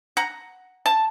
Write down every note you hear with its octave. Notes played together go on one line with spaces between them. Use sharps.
F#5 A#5
A5